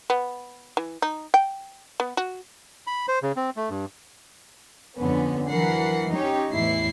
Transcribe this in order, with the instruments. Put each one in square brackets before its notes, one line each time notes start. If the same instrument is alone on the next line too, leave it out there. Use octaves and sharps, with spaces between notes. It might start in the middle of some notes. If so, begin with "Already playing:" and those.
[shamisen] B3
E3
D#4
G5
B3
F#4
[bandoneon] B5
C5
C#3
C4
A3
G2
[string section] F2 D3 B3 C#4
E3 F#3 A#4 F#5 C7
C#4 D#4 G4 C#5
E2 A2 E3 E4 C7